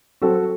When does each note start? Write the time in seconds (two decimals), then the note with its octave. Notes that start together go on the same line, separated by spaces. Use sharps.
0.22 F#3 C4 F#4 A4